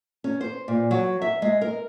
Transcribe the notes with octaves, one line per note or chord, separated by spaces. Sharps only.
C#4
C5
A#2
F#3
E5
G#3
A#4